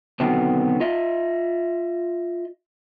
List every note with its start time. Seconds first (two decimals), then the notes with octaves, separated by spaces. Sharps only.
0.20 B2 D3 D#3 F#3 B3 C4
0.80 F4 D#5 E5